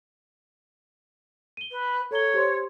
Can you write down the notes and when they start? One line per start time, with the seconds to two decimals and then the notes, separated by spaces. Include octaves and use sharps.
1.57 D#7 G7
1.71 B4
2.11 A4 C#5 A#5 G7
2.34 G4 C5 C6